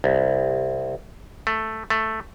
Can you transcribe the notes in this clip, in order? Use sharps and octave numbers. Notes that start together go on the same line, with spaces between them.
C2
A3
A3